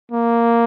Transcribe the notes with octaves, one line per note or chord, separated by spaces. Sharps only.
A#3